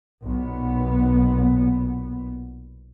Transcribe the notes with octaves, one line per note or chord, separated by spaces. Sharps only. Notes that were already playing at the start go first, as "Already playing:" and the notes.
B1 A#2 B3